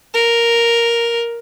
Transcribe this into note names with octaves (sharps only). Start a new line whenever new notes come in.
A#4